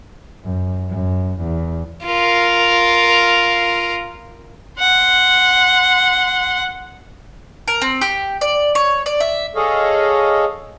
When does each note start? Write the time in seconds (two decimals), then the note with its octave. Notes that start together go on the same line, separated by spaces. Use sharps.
0.43 F#2
0.89 F#2
1.41 E2
2.05 F4 A#4
4.79 F#5 C6
7.68 A#4
7.82 C4
8.01 G4
8.41 D5
8.75 C#5
9.06 D5
9.20 E5
9.55 G#4 A4 C#5 D#5 F5